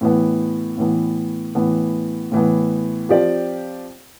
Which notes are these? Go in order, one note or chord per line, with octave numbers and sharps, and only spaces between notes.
A2 E3 B3
A2 E3 B3
A2 E3 B3
A2 E3 B3
F3 C4 G4 D5 F5